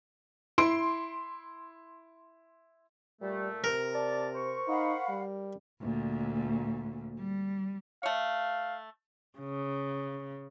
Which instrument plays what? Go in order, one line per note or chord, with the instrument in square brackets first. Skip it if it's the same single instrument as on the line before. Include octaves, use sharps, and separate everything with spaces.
[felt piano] E4 C6 D7
[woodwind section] A#2 A3 [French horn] G3
[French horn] C3 [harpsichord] A#4
[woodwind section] D5 A5
C5 C#6
[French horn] D#4 [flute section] F5 F#5 B5
[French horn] G3
[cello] D2 A#2
G3
[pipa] A3 C#5 [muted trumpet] F5
[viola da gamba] C#3